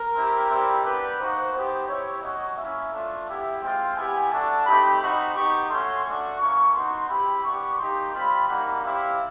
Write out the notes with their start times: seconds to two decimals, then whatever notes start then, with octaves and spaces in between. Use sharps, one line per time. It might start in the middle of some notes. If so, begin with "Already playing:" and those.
Already playing: A#4
0.15 C4 E4 G4
0.49 G3 C4 E4 G4
0.84 B3 D4 G4 B4
1.19 A#3 D#4 F#4 C5
1.53 B3 D#4 G4 C5
1.88 C4 E4 G4 C#5
2.22 A#3 C#4 F#4 D#5
2.57 A#3 C#4 E4 E5
2.92 A3 D4 F4
3.27 B3 E4 G4
3.61 G#3 C4 F4 G5
3.96 B3 E4 G4 G#5
4.31 A3 D4 F#4 A5
4.66 A3 C4 D#4 G4 B5
5.00 C4 D#4 F#4 B5
5.35 B3 D#4 G4 C#6
5.69 A3 C#4 F#4 C6
6.04 A3 D4 F#4 C#6
6.39 A#3 C#4 E4 C#6
6.74 B3 D#4 F#4 C6
7.09 C4 E4 G4 B5
7.43 B3 D4 G4 C#6
7.78 A#3 D#4 G4 C6
8.13 G3 C4 F4 B5
8.47 G3 A#3 D#4 F#4 B5
8.82 G3 C4 E4 G4 F5